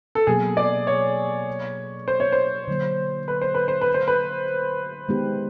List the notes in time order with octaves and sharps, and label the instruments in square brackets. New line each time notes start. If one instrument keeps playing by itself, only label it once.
[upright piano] A4
[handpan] B2 F#3 A#3 [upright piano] G#4
[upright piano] D5
C#5
C5
C#5
C5
[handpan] D3 F#3 A#3
[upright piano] B4
C5
B4
C5
B4
C5
B4
[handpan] D#3 G#3 B3 D#4 G4